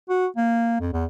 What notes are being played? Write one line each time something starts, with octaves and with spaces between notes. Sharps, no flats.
F#4
A#3
F2
E2